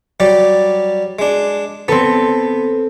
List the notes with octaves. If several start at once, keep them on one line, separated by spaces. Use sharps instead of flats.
F#3 G3 D5
G#3 D4
B3 C4 A4